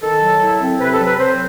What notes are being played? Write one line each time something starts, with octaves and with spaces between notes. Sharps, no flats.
D#3 A4
F#3
E4
C4
C3 B4
A4
F#3
B4
C4 C5